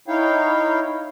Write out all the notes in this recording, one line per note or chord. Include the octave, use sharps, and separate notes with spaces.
D#4 E4 C#5 F5 G5